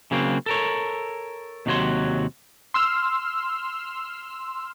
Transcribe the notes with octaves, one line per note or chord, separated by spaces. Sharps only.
C#3 F#3 A#3 C4
A4 A#4 C#5
D#2 C3 F#3 F#4 C#5 C6
C6 E6 F6